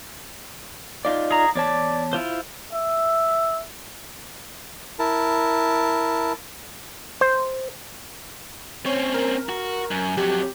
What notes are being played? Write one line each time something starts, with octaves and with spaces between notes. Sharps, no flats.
D#4 F4 D5
G#4 A#5
E2 C#5 D5 A5
E4 F4 C5
E5
E4 A#4 A5
C5
C4 C#4 C#5
A#4
F#4
F#2
F2 F#3 G4